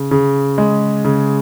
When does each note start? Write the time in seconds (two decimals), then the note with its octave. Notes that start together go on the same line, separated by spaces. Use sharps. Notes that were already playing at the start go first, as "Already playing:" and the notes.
Already playing: C#3
0.11 C#3
0.58 G#3
1.05 C#3